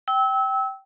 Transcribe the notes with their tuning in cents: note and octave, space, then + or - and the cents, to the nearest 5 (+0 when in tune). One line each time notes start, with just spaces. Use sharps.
G5 -15 E6 -25